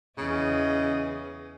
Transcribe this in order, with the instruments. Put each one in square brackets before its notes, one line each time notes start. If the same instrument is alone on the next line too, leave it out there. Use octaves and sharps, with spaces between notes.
[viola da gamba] E2 D#5 [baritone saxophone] C#3